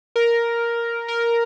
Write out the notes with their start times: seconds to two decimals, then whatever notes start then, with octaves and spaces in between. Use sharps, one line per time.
0.16 A#4
1.08 A#4